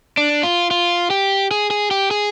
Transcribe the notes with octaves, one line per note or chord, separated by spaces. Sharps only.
D4
F4
F4
G4
G#4
G#4
G4
G#4